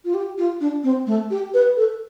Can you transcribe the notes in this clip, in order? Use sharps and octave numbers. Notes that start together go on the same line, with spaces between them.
F4
G4
F4
D4
C4
A3
G4
B4
A4